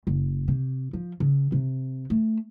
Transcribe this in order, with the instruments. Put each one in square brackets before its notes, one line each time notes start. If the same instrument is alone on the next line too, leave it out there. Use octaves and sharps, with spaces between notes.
[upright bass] F#1
C3
F3
C#3
C3
A3